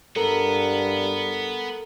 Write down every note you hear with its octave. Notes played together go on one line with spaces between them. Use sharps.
G2 B3 A4 A#4 A#5